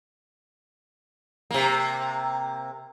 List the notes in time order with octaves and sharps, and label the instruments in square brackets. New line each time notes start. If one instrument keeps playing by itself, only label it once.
[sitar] C3 A#3